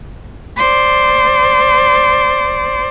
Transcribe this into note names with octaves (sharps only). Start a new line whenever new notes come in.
C5 D5